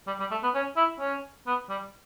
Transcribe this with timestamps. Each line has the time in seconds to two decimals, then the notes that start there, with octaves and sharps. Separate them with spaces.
0.07 G3
0.20 G3
0.31 A3
0.43 B3
0.55 C#4
0.77 E4
1.00 C#4
1.47 B3
1.69 G3